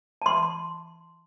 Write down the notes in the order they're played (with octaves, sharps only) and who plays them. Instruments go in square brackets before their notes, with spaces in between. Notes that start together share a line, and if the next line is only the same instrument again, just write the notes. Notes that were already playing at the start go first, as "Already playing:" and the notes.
[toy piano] A5 C6